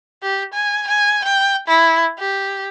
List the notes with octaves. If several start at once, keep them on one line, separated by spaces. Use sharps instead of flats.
G4
G#5
G#5
G5
E4
G4